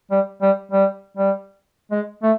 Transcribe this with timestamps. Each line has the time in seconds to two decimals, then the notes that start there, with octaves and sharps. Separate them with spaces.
0.11 G3
0.42 G3
0.72 G3
1.17 G3
1.91 G#3
2.23 A3